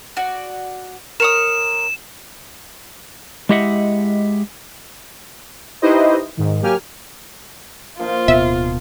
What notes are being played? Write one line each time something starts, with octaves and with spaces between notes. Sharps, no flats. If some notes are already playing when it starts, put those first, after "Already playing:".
F#4 D5
A#4 C#5 D#6 E7
G#3 E4 G4 D#5 E5 F#5
D#4 E4 G4 B4 C5 D#5
G#2 D#3
F#3 A#3 G4 G#5 F6
F3 A#3 D#4 F4
D1 B2 B3 E5